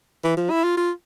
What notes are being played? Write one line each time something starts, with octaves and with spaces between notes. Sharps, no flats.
E3
F3
E4
F4
F4